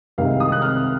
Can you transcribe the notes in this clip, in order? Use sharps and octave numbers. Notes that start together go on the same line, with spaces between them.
C2 C3 D#3 G#3 F5
D#6
F#6
F6